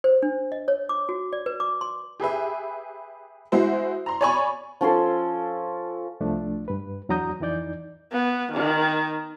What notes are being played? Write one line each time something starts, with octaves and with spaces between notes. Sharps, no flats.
C5
D4
D#5
C#5
D6
F#4
D5
B4
D6
C6
G4 G#4 B4 E5
G#3 E4 F#4 C5 E5
A#5 C6
C#5 D5 G#5 B5 C#6
F3 C#4 A4 C6
C2 F3 A3 D4
G2 B4
E2 F#3 D4 A#5 D#6 G6
F2 E3 D#4 D5 G6
B3
D#3